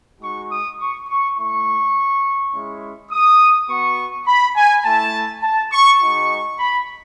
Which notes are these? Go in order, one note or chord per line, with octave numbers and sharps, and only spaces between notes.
G#3 D#4 F#4 C#6
D#6
C#6
C#6
A3 E4 C#6
G#3 C#4 E4
D#6
B3 F#4 C#6
B5
G#5
A3 E4 A5
A5
C#6
G#3 D#4 F#4 C#6
B5